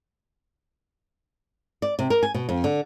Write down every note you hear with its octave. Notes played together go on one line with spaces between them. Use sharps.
D5
C3
A#4
G#5
B2
F2
D3